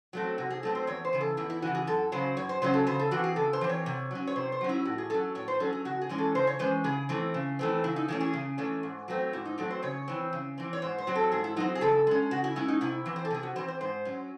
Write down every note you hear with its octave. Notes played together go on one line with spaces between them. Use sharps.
F#3 A3 C4
C3 F#4
G#4
F#3 A3 C4 A4
C5
E2 C#5
C5
C#3 E3
A4
E2 E4
E4
C#3 E3 F#4
G#4
F#2 A4
C#3 F#3 C#4 C5
F#2 C#5
C5
C#3 F#3 C#4 C5
A4
C#3 C5
A4
E3 C4 F#4
G#4
C#3 A4
C5
E3 C4
C#5
C3
F#3 C#4
C#5
C3 C5
C5
F#3 C#4
E4
A2 F#4
G#4
F#3 C#4 A4
A2 C#5
C5
F#3 C#4 A4
G#4
C#3 F#4
G#4
E3 G#3 C#4
A4
C#3 C5
C#5
E3 G#3 C#4 C5
C#3 G#4
E3 A3 C4
C#3
E3 A3 C4
C#3 E4
D#4
E3 A3 C#4 E4
G#4
C#3
E3 A3 C#4
G#2
F#3 A3 C4
G#2 E4
D#4
F#3 A3 C4 A4
C5
C#3 C#5
E3 C4
C#3
E3 C4
C#5
G#2 C5
C5
F#3 C4
A4
G#2 G#4
E4
F#3 C4 D#4
G#4
C#3 A4
G#3 C#4
C#3 F#4
E4
G#3 C#4 E4
D#4
C3 E4
E3 C4
C5
A4
C3 G#4
F#4
E3 C4 C5
C5
G#2 C5
F#3 C#4